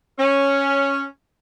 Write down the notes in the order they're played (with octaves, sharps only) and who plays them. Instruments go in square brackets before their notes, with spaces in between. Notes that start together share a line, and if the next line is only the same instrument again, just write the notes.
[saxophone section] C#4